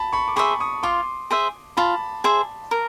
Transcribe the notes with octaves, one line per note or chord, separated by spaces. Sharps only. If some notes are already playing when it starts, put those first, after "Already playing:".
Already playing: A5 B5
B5 C#6
D6
G#4 C5 E5 B5 C#6
C#6 D#6
F4 C6 D6
G#4 C5 E5
F4 A5 B5
G#4 C5 E5
A#4